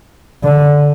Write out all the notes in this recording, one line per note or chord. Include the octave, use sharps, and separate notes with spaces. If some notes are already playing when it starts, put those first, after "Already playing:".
D3